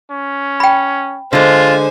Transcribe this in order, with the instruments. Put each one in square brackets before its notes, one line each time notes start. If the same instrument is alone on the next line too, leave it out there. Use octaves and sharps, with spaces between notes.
[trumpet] C#4
[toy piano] G5 B5
[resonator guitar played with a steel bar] D3 G#3 [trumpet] F4 [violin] C5 G#5